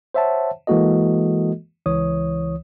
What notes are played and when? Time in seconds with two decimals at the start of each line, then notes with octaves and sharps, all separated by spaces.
0.14 C5 C#5 E5 F#5 A5
0.67 E3 G#3 A#3 F#4 A4 D#5
1.86 C#2 E3 C#5 D#6